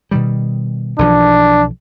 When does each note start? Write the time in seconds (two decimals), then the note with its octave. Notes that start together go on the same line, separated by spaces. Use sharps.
0.11 B2 D#3 G3
0.99 B1 E3 F3 D4